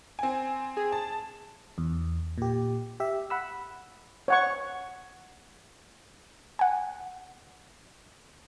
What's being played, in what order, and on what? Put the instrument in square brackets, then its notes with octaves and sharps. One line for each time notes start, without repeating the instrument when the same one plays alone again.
[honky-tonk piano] C4 G#5
[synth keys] G#4
[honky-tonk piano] A5
[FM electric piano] E2
A#2 G4
G4 E5
F#5 B5 E6
[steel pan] C#5 F#5 C#6
[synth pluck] F#5 G#5